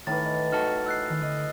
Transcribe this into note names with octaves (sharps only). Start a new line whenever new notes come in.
A2 D#3 E3 A6
D#5
D#4 F#4 A4 F6
E6 F#6 C7
D#3
D3 D#5